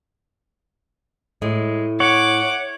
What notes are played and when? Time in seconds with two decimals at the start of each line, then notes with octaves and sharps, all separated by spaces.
1.42 A2 G#3
2.00 C#5 F#5 D6